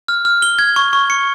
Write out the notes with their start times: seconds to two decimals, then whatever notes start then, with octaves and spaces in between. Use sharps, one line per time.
0.08 F6
0.25 F6
0.42 G7
0.59 G#6
0.76 C#6
0.93 C#6
1.10 C#7